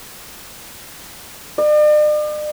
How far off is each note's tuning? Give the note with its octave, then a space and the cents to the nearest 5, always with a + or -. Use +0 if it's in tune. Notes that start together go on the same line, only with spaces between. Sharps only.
D5 +45